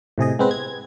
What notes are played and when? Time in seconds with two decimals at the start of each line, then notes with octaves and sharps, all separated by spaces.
0.18 A2 C3 G#4 D#5
0.39 G#3 B3 C4 B4
0.51 G#6